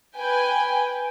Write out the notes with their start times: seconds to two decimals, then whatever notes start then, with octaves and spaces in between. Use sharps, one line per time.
0.17 B4 G5 G#5